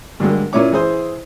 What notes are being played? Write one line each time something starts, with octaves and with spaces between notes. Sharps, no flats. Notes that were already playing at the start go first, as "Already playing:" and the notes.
G2 D3 F#3 G#3 A#3
A#2 C#4 E4 C#5 D6
E3 G#4 C5